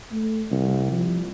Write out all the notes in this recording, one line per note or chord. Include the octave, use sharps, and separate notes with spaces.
A3
C2
F3